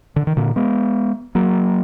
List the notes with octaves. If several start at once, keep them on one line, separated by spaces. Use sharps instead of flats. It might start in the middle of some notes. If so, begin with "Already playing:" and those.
D3
D#3
A#2 D3
G#3 B3
F#3 A#3